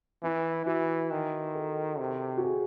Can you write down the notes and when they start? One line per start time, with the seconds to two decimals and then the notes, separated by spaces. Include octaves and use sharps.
0.23 E3 E4
0.66 E3 F#4
1.11 D#3
1.55 A4
1.99 C3
2.37 F#4
2.43 G#4